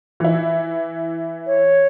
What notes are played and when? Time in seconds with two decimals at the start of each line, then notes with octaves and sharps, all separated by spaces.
0.20 E3 E4
1.47 C#5